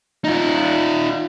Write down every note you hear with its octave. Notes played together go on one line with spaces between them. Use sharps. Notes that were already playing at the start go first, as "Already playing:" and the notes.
D#4 F4